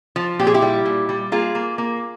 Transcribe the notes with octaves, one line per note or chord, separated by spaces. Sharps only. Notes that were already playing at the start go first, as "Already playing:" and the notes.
F3
A#2 G4
G#4
E4 G4
G3
A#2
G3
A#3 F4 G#4
A#3
A#3